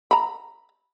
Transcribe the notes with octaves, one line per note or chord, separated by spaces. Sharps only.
A#5 B5